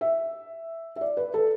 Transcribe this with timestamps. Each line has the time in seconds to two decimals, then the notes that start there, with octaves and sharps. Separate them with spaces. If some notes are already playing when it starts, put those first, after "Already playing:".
0.01 E5
0.96 E5
1.01 D5
1.17 B4
1.34 A4